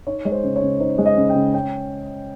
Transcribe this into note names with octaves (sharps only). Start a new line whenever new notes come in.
D#4 C#5
G#3 C#5
C5
C#3
C#5
C#3
D#4 C5
G#3
D#5
C#3
G5
C#3
C#4 G5